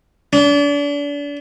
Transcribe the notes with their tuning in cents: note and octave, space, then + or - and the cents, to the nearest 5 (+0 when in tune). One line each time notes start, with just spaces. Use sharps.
D4 -35